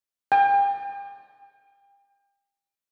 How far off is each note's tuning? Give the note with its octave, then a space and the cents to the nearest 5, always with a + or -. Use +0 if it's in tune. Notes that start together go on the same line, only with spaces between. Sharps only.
G5 +35